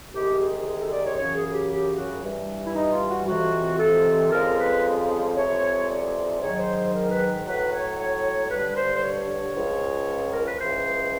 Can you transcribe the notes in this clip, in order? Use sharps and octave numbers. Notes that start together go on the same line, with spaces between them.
C2 C3 D#3 G#3 G4
G#4
G4
G#4
A4
D5
C#5
F#2 C#3 E3 C#5
G#4
G#4
G4
G4
F#4
G2 E3 G3
E4
D#4
F4
F#4
F2 C3 E3 F#4
A4
F2 C#3 F3 G#3 A#4
B4
F2 C3 E3 G#3 C#5
D5
G#2 D#3 F#3 C#5
C5
C5
A#4
B4
A2 F#3 B4
C#5
C#5
G2 D3 G3 B4
C5
C5
C#5
C#2 C#3 F3
A#4
B4
C#2 C#3 E3 C5